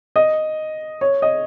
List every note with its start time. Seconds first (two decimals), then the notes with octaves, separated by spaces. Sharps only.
0.16 D#5
1.01 C#5
1.22 D#5